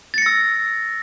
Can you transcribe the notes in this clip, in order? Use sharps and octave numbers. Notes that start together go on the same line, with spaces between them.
E6 A6 A#6 C#7